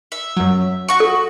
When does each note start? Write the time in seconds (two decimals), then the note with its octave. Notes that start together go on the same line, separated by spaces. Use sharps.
0.12 E5
0.36 F#2 F#3
0.88 F#4 C#6
1.00 A4